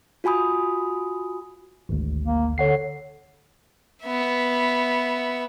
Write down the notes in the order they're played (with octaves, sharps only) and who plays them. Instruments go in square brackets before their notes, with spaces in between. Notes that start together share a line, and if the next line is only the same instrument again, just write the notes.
[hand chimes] F4 F#4 G#5 B5 D#6
[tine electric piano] G#1 D2
[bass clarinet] A#3
[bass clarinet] D3 [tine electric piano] C#5 F#5 C7
[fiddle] B3 E5